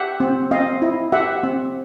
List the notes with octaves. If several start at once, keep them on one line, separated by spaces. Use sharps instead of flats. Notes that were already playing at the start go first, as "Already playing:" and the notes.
Already playing: G4 E5 F#5
C4
C4 D#5 F5
E4
G4 E5 F#5
C4